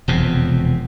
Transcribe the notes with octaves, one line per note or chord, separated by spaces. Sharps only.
E1 F2 C3